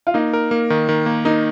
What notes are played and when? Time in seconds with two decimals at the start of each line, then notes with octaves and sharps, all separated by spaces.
0.07 F4
0.14 A#3 D#4
0.33 A#4
0.51 A#3
0.70 D#3
0.89 D#3
1.06 A#3
1.25 A#3 D#4